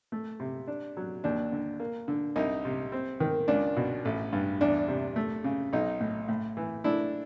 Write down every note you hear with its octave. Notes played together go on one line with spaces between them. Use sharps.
A3
C3
D4
F#3
D#2 D4
D3
A#3
D3
C2 D#4
C3
C4
D#3
C#2 D4
B2
A1
G2
E2 D4
C3
A3
C#3
B1 D#4
A2
A2
E3
A3 D4 E4